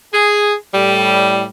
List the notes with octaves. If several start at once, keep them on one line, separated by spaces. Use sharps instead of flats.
G#4
A2 G3